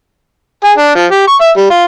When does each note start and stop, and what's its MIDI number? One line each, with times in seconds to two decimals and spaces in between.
0.64 0.72 68
0.78 0.92 62
0.95 1.06 53
1.11 1.27 67
1.28 1.36 85
1.41 1.51 76
1.57 1.66 55
1.70 1.84 65